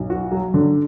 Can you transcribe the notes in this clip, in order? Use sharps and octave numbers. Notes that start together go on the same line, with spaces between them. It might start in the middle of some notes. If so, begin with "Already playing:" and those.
Already playing: B1
F#4
F#3
D3